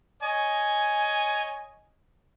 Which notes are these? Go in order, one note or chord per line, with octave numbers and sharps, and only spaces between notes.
C#5 D#5 G#5